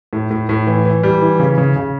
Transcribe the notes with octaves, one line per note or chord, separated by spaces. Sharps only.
A2
A2
A2
E3
E3
G3
E3
C#3
C#3
C#3